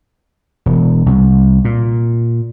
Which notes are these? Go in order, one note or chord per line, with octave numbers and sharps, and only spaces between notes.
E1
C2
A#2